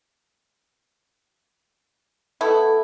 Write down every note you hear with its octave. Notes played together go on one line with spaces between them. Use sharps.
A3 B3 E4 A4